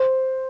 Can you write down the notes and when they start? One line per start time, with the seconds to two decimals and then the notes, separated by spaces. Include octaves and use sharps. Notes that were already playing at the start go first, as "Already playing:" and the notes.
Already playing: C5